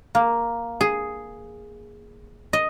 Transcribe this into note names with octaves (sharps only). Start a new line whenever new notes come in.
A#3
G#4
D#5